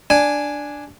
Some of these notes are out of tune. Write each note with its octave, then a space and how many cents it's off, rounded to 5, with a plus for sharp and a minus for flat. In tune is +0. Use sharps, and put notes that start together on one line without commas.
D4 +0 G#5 +0